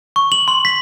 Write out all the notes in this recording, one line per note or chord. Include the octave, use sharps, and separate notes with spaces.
C#6
F#7
C6
B6